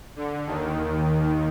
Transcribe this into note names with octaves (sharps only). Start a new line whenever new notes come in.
D3
D#2 D#3